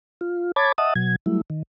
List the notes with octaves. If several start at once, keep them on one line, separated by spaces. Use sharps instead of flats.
F4
C#5 A5 B5 D6 G#6 A6
D#5 E5 F#5 A5 D#6
B2 F#3 G#6
F#3 G3 A3 E4
D#3